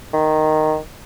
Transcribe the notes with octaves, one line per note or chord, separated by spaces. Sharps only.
D#3